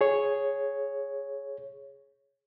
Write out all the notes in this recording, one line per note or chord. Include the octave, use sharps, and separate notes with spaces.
G#4 C#5